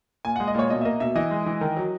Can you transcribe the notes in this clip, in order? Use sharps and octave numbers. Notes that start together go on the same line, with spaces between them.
A#2 G#5
G#3 F#5
D#5
A#2 C#5
B2 D#5
E5
A#3 D#5
B2 E5
E3 D#5
G#3
E3
D#3
F#3